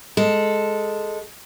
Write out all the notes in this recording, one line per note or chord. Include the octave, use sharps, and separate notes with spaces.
G#3 A4